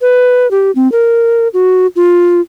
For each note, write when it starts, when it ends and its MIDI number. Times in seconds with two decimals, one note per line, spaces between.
0.01 0.49 71
0.51 0.71 67
0.75 0.90 60
0.92 1.48 70
1.54 1.87 66
1.96 2.41 65